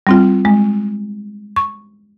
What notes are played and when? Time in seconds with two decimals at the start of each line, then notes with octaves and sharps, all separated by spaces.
0.07 G3 C4 F4
0.45 G#3
1.56 C#6